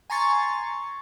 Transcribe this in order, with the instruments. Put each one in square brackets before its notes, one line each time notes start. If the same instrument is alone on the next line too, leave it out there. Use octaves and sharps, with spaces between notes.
[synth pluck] G#5 A#5 C6 C#6 A6